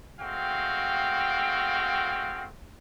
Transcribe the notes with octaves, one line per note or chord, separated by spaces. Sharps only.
G#3 A3 C4 F#4 F5 G5